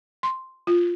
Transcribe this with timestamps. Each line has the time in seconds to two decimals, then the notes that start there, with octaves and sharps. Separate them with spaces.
0.23 C6
0.67 F4